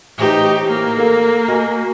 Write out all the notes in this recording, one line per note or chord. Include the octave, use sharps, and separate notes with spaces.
A2 E3 D#4 G4 C5
A#3
A4 A#4 F5
F#4 D#5 G#5